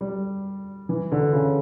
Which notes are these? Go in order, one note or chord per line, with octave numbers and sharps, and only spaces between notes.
G3
E3
D3
C#3